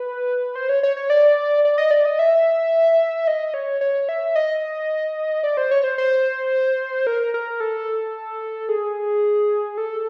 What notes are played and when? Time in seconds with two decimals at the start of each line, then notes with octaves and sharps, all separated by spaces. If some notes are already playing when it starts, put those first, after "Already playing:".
Already playing: B4
0.56 C5
0.69 C#5
0.83 C#5
0.97 C#5
1.10 D5
1.65 D5
1.78 D#5
1.91 D5
2.05 D#5
2.19 E5
3.28 D#5
3.54 C#5
3.81 C#5
4.09 E5
4.36 D#5
5.43 D5
5.57 C5
5.71 C#5
5.84 C5
5.98 C5
7.07 A#4
7.34 A#4
7.60 A4
8.69 G#4
9.78 A4